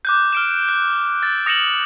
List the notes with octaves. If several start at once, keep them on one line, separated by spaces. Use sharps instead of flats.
D6 F#6 G6
F6 D7 E7
F#6
E6 A6
D#6 A#6 C#7 E7 F#7